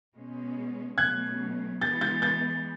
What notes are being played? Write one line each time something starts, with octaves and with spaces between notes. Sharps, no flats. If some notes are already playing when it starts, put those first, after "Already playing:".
B2 G#3 C#4
B2 F#3 A3 C#4 F#6 G#6
E3 G#3 B3 G6 A6
G6 A6
G6 A6